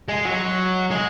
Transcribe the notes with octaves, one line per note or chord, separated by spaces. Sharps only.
G#3
F#3
G#3